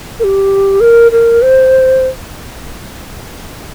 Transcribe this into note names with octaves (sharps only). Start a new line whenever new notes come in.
A#4
G4
A#4
A#4
C5